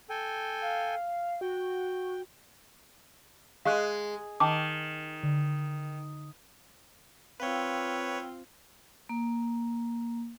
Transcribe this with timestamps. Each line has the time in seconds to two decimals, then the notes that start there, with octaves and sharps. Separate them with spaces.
0.10 A4 G5 G#5
0.62 F5
1.41 F#4 G5
3.65 G#3 F5 C#6 F#6
4.40 D#3 G5 A5 D6
5.23 D3
7.40 C4 F4 B4 C#5 F5 G5 E6
9.09 A#3